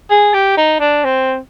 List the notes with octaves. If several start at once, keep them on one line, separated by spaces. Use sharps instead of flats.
G#4
G4
D#4
D4
C4